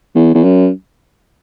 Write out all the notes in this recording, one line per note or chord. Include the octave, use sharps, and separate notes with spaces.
E2
E2
F#2